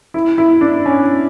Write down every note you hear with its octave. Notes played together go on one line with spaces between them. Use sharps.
E4
E4
D4
C#4